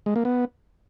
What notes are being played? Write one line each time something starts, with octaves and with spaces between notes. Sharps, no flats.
G#3
A#3
B3